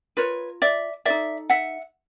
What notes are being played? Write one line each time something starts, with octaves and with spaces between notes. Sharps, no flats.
F4 A#4 B4 C#5
D5 E5
D#4 F#4 A4 D5 E5
E5 F#5